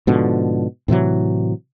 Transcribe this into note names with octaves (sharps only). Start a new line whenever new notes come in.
G#2 B2 D3 F3
A2 C3 E3 F#3